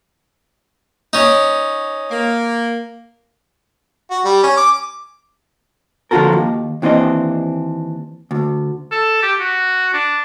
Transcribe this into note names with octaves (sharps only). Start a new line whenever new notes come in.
C#4 D#4
A#3
F#4
G3
C#4
D6
D3 F3 F4 F#4 A4 A#4
D#2
D#2 E3 C4 D4 D#5
D2
A4
G4
F#4
D4